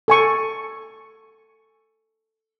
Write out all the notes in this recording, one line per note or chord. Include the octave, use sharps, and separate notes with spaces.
A4 G#5 C#6